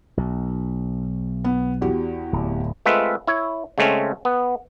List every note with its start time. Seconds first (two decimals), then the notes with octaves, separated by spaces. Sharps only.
0.17 B1
1.44 B3
1.81 E2 F#4 G4
2.33 D1
2.86 G#3 A3 C4 F4 B4 E5
3.27 E4 C#5
3.78 C#3 G#3 A3 C4 C#4
4.25 B3